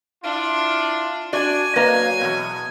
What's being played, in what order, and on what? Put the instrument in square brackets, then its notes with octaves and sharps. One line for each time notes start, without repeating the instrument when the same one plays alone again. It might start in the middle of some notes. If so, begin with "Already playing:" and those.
[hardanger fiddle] D4 [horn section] E4 F4
[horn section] D4 [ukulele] F#4 [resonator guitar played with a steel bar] D5 [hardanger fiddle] G#5
[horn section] F#3 [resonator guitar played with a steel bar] A#3 F5 A#5 [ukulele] B4 D#5
[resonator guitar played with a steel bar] E2 B2